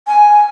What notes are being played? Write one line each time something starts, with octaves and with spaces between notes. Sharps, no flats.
G#5